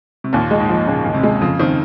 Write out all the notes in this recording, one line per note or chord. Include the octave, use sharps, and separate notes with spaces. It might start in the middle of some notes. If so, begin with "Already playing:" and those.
C3
D#2 A#2
G#3
G#2
F3
A#2 C#3
D#2
C3
G#3
F2 C#3
D#3 C4